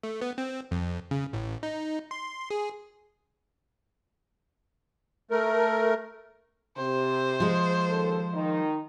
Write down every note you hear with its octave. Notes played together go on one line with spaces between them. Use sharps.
A3
B3
C4
F2
C#3
A1
D#4
C6
G#4
A3 A#4
C3 C5
F3 G#3
D#2 A4
D#3 D#4